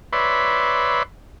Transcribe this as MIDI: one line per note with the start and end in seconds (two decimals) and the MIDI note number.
0.13 1.03 71
0.13 1.03 73
0.13 1.03 74
0.13 1.03 76
0.13 1.03 83
0.13 1.03 84